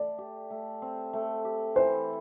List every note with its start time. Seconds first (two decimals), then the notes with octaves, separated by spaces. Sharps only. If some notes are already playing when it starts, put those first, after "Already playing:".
Already playing: A3 D5
0.18 G4
0.50 A3
0.82 C4
1.13 A3
1.45 G4
1.76 E3 C5